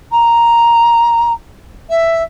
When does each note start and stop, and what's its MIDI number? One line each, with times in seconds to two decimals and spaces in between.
0.11 1.32 82
1.89 2.22 76